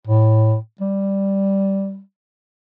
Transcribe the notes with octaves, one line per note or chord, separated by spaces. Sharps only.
A2
G3